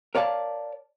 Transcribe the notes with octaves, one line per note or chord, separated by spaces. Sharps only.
A#4 C#5 D5 F5 A5